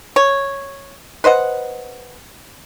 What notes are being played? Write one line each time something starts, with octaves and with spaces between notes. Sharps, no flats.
C#5
B4 C5 D#5 F#5